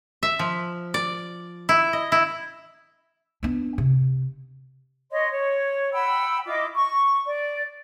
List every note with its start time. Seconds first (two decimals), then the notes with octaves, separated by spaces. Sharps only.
0.23 E5
0.39 F3
0.94 D5
1.69 E4
1.93 D#5
2.12 E4
3.43 B3 D4
3.78 C3
5.11 C#5 D#5 C6
5.31 C#5
5.93 F#5 G5 B5 E6
6.46 E4 F4 D#5 D6
6.75 C#6
7.26 D5